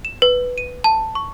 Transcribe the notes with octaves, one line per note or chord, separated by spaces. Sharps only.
E7
B4
D#7
A5
C#6